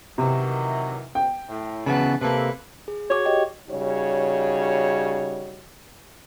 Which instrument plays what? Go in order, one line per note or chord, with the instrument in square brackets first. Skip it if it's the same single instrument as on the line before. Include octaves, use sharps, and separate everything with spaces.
[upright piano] C3 [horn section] D#3 E3 F#3
[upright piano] G5
[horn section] A2
[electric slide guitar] C#3 E3 B3 [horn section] F#3 B4 A5
[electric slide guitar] C3 A#3 [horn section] A4 B4
[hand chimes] G#4
[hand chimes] F#4 G#4 D6 [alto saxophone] C#5
[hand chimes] G4 D#5 G5
[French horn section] C#3 G3 D#4 F#4 C#5